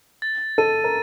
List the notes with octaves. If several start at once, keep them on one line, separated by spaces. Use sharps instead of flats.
A6
A4 D#7
A#4